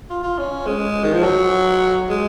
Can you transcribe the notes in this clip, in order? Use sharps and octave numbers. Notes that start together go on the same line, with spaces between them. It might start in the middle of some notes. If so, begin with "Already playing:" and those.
F4
F4
C#4
G#3
D#3
F3
F#3
G#3